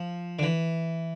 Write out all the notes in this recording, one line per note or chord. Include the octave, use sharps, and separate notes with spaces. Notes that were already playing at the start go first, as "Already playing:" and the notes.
Already playing: F3
D3
E3